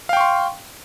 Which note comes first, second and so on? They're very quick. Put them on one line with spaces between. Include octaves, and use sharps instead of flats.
F5 G5 C#6 C6